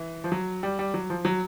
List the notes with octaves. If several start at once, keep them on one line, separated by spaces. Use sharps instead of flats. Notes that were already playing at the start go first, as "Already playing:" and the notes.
Already playing: E3
F3
F#3
G3
G3
F#3
F3
F#3